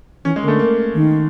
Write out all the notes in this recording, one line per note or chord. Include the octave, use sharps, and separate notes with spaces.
E3 C#4
G#3
D3 A#3
A3
A#3
D#3